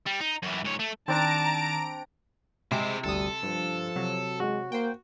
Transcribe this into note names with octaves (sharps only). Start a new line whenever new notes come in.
G3
D#4
F#2 E3
G#2 C#5
A3
D#3 C4 D4 A5 A#5 D7
C3 G#3 C4 E4 C5 D6
G1 D2 G3 A4 D#6
G2 F3
C3 F#3
G#3 F#4
A#3 C5 G5